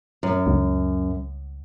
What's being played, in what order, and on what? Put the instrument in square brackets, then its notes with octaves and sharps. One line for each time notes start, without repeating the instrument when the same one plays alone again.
[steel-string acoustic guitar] F#2
[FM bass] C#2